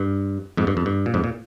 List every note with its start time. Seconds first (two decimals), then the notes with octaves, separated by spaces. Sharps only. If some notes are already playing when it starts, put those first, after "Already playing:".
Already playing: G2
0.57 F2 G#2
0.67 G2
0.77 F2
0.86 G2
1.06 A#2
1.14 F2 G#2
1.24 A#2